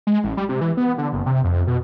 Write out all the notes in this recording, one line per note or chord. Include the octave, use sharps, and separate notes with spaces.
G#3
A1
G3
C3
E3
B3
D3
F#1
C3
F2
B2